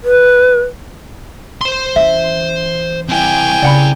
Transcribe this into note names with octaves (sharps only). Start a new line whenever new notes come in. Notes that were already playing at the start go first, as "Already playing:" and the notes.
B4
C5 C6
E3 C#4 E5
C4 E4 G5 G#5
C#3 D5 F#5 B5